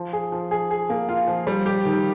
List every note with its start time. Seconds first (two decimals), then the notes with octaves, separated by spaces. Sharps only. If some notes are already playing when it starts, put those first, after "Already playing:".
Already playing: F3
0.13 G#4
0.32 F3
0.51 G#4
0.71 G#4
0.90 A#3
1.09 F4
1.28 F3
1.47 G3
1.66 G4
1.85 D#3